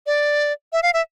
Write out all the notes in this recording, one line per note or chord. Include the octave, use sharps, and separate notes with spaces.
D5
E5
F5
E5